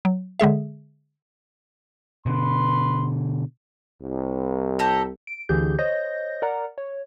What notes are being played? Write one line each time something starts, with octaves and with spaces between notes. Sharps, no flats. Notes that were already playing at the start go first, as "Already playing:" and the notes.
F#3
D3 G#3 G#4 E5
B2 D3 B4 C6
C2
G4 A4 A#5
D7
D2 D3 E3 G4 G#4 G6
C5 C#5 D#5 G6 A#6
A#4 D5 F#5 A#5
C#5